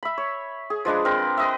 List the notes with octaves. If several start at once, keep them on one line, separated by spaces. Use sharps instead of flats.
E5 B5
C#5
G#4
F3 G#3 D4 B4
C4 A#4 B4
B4 D#5 E5